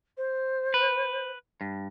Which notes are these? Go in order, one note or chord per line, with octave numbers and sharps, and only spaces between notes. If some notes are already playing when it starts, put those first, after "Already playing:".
C5
B4
G2